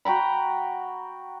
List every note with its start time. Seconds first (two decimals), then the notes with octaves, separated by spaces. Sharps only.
0.05 F#4 G5 A#5 B5